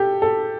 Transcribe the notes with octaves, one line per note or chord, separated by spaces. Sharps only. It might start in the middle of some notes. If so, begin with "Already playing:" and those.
Already playing: G4 A4
A4